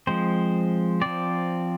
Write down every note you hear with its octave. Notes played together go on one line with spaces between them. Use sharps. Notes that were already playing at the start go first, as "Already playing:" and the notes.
F3 G#3 C4 C5
F3 C4 D5